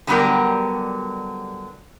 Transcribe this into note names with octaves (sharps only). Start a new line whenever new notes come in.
D3 F#3 G3 B3 G4 A#4